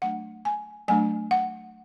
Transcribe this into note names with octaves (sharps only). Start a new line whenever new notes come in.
F#3 A3 D4 F#5
G#5
F#3 A3 D4 G#5
F#5